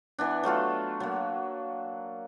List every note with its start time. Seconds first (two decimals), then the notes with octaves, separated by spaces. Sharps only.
0.19 E3 B3 D4
0.43 F#3 A3 F4 A4
1.00 F#3 A#3